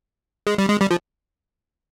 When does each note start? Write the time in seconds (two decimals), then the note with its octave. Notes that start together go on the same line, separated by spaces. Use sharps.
0.47 G#3
0.58 G3
0.69 G#3
0.81 G3
0.91 F3